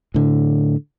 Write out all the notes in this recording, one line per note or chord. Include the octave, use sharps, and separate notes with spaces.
A2 D3